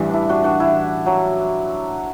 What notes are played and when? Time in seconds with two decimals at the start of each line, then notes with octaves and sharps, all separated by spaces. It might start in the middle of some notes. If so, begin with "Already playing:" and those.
Already playing: A1 G2 E3 G3
0.09 D4 E4
0.29 D4 F#4
0.44 D4 F#4
0.60 E4
1.06 F#3